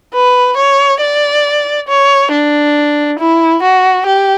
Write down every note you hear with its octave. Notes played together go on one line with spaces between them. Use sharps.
B4
C#5
D5
C#5
D4
E4
F#4
G4